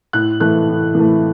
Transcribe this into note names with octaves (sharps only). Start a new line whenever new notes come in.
A2 F#6
E3 A3 F#6
A2
E3 A3